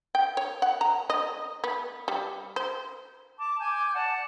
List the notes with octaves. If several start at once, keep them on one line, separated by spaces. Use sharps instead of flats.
G5
C#5
F#5
A#5
D#5
B3
G3
C5
A5 D6
G#5 D6 G6
D5 F#5 A5